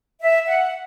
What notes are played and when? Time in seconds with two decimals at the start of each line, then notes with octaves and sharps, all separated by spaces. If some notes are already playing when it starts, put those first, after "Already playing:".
0.22 E5
0.47 F#5